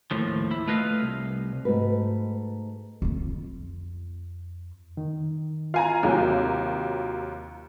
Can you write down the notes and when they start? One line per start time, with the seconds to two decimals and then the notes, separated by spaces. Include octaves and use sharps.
0.11 D#2 A2 F3
0.51 E4
0.68 A3 F4 B4 D#5 F5
1.02 C2
1.65 G#2 A3 F#4 B4
3.02 F2 F4
4.97 D#3
5.74 F4 F5 G#5 A#5
6.03 D#2 C3 F#3